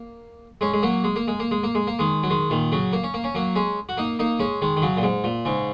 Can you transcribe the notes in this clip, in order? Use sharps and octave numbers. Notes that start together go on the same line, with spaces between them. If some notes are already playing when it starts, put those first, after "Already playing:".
Already playing: A#3
G#3 C#4
G#3
F#3 A#3
G#3
A#3
G#3
A#3
G#3
A#3
G#3
A#3
D#3 G#3
F#3
D#3 G#3
A#2 D#3
C#3 F#3
A#3
C#4
A#3
C#4
F#3 A#3
G#3 C#4
F#4
A#3 D#4
A#3 D#4
G#3 C#4
D#3 G#3
D#3
C#3 F#3
A#2
G#2
A#2
G#2 C#3